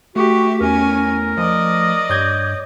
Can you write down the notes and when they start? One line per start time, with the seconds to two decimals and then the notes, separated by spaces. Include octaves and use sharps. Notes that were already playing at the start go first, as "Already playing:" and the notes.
0.16 A3 F#4 G4 E5
0.61 E2 C#4 A#4 G#5
1.38 F3 D5 D#5
2.10 G2 C#5 G6 G#6